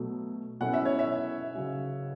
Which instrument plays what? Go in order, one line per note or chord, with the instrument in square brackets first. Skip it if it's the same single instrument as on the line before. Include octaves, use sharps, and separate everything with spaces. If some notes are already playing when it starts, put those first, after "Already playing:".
Already playing: [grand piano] B2 F#3 A3
[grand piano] B2 F#3 C#4 E4 A4 [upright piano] F#5
[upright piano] E5
C#5
E5
[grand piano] C#3 F#3 C#4 F#4